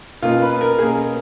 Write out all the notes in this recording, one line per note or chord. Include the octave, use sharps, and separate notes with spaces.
B2 A#3 C#4 F4
B4
A#4
B2 A#3 C#4 G#4